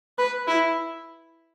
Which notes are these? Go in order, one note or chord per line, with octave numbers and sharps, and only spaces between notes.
B4
E4